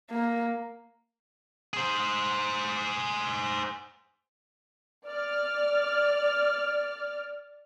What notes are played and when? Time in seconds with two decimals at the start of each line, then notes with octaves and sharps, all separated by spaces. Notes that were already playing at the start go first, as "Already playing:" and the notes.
0.10 A#3
1.74 G#4 C5
5.06 D5 F6